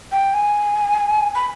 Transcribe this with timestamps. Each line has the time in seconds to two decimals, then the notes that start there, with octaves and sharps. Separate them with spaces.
0.12 G5
0.33 G#5
1.35 B5